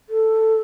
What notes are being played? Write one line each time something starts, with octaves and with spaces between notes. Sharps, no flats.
A4